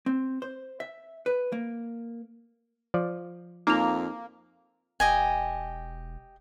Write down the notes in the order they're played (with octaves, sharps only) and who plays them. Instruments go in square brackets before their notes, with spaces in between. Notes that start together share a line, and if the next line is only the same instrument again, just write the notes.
[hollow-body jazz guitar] C4
C5
E5
B4
A#3
[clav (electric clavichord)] F3 D5
[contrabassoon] F2 [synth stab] A#3 [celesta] D#4 F7
[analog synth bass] E1 [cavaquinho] G4 D#5 G#5